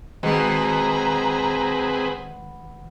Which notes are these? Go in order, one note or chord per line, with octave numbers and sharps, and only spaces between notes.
B2 D#3 G#3 C4 G#4 B4 A#5